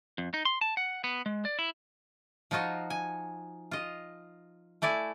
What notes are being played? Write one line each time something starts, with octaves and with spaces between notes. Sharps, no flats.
F2
D#4
C6
A5
F#5
B3
G#3
D5
E4
F3 D#4 F4 F#4 D#5
G#5
F4 D#5
A3 E4 D5 G#5